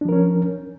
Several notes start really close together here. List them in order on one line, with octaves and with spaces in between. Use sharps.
D4 F3 A#4 C#4